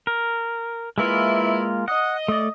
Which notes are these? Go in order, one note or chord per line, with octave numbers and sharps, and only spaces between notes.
A#4
E3 G#3 A#3 E4 F4
D#5 F#5
A3 D5